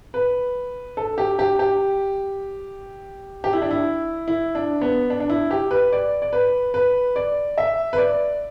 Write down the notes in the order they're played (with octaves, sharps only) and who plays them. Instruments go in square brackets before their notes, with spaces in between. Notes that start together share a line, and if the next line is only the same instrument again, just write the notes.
[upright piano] B4
A4
G4
G4
G4
G4
E4
D4
E4
E4
D4
B3
D4
D4
E4
G4
B4
D5
D5
B4
B4
D5
E5
B4
D5